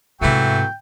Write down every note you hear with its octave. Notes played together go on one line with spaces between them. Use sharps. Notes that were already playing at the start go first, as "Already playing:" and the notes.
G#2 C3 E3 F#3 A3 G5